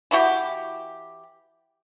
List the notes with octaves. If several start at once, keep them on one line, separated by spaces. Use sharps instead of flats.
E3 E4 F#4 G4